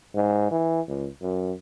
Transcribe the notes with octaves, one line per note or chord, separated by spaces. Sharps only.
G#2
E3
C#2
F#2